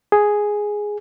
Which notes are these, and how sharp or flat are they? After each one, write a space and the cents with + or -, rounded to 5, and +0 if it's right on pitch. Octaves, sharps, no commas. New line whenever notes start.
G#4 +0